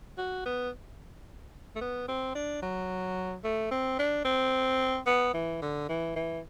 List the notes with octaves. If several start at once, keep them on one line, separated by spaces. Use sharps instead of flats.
F#4
B3
A3
B3
C4
D4
F#3
A3
C4
D4
C4
B3
E3
D3
E3
E3